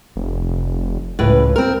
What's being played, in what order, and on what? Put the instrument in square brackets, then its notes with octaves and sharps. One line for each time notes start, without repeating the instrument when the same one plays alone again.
[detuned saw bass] F1
[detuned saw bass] C#2 [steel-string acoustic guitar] A2 B4
[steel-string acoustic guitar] C4 A#4